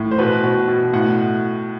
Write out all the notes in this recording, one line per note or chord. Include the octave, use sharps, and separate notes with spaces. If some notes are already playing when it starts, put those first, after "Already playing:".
Already playing: A2
C5
B2 B4
B2
B2
A2 F#5